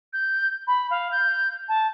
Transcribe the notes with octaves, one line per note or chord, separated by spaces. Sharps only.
G6
B5
F5
G6
A5